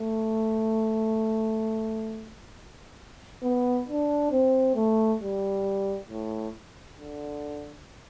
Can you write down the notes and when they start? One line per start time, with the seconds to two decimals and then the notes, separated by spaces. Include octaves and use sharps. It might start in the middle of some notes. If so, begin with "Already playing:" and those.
Already playing: A3
3.43 B3
3.88 D4
4.32 C4
4.76 A3
5.21 G3
6.08 A2
6.96 D3